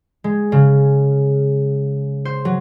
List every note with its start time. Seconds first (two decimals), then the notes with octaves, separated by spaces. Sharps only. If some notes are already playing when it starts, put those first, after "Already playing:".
0.24 G#3
0.52 C#3
2.25 C5
2.45 F#3